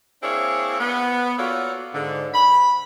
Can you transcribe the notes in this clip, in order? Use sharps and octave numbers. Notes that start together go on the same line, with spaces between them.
A#3 C4 D4 E4 G#4 C#5
B3
A#3 F4 F#4 A4 C#5 D5
G#2 D3
B5